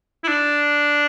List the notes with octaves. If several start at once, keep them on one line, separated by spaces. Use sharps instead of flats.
E4
D4